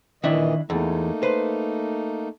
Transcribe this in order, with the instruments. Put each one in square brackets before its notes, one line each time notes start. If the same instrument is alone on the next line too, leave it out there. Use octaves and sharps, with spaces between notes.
[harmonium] A#2 E3 D#5 [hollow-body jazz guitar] D#3 D4 E4
[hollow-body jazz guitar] E2 [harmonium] A3 A#3 D#4
[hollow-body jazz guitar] B4 C5